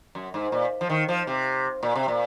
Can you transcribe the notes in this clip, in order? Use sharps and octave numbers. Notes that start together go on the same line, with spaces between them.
F#2
G#2
A#2
F3
D#3
F3
C3
A#2
C3
A#2